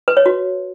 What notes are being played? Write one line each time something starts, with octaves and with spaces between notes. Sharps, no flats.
B4
C#5
F#4